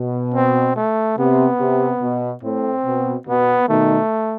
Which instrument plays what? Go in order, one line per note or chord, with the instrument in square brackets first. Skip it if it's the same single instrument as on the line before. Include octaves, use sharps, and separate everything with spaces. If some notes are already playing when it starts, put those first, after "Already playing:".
Already playing: [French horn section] B2
[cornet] C4
A3
[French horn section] C3 [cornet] B3
[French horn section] C3
B2
[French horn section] A2 [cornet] C4
[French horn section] B2
[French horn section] B2 [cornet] B3
[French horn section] B2 D#3 [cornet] A3